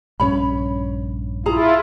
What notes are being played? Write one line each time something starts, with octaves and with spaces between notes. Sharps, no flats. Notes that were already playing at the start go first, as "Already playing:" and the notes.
A#1 G2 C#4 C#5 B5
E4 F4 G#4 A#5